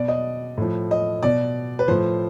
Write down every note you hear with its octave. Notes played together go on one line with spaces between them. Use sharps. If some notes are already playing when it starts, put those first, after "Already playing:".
Already playing: B2 D5
D#5
A2 F3
D#5
B2 D5
B4
A2 F3 C5